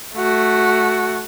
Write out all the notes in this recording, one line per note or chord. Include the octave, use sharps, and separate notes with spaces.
A3 F#4